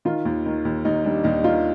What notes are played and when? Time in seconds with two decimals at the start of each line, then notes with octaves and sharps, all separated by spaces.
0.05 D#3 F4
0.25 D#2
0.46 D#3
0.65 D#2
0.85 D#2 D#4
1.05 G3 D4
1.24 D#2 D#4
1.44 D#3 F4